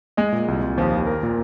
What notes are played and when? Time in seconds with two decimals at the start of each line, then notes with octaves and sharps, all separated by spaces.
0.17 G#3 D#5
0.32 A#2
0.48 C2
0.62 C2
0.77 D#2 F3
0.93 D#2
1.07 A#4
1.23 A#2